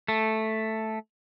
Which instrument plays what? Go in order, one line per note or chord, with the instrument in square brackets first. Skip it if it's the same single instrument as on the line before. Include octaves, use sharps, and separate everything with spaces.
[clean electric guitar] A3